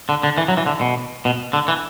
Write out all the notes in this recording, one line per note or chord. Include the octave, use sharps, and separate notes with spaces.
D3
D3
E3
F#3
E3
D3
B2
B2
D3
E3